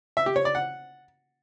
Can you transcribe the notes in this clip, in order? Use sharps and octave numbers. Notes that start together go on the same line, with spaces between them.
E5
G4
C#5
D5
F#5